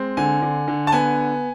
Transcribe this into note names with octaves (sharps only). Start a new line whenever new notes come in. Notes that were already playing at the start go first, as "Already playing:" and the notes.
Already playing: G#3 C4
D3 G#5
D3
D3
A5
B3 G#5